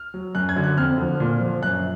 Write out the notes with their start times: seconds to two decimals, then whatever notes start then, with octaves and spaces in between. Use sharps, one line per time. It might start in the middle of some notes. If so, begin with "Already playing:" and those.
Already playing: F6
0.14 F#3
0.35 F#2 F#6
0.49 G#6
0.56 D3 F#3
0.63 F#6
0.77 F2 F6
0.98 D3 F3
1.20 A#2
1.41 F3
1.62 F#2 F#6